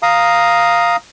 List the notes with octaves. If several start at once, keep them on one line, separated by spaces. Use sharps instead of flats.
F5 A#5 D#6